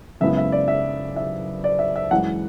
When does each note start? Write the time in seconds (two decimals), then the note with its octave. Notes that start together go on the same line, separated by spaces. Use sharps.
0.21 F#2 C#3 G#3 B3 E4 E5
0.37 E5
0.52 D5
0.68 E5
1.16 E5
1.64 D5
1.79 E5
1.96 E5
2.11 F#2 E3 G#3 F#5